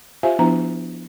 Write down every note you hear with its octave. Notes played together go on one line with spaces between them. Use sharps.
F4 G4 C5 E5 F5 G#5
F3 B3 D4 E4 A#5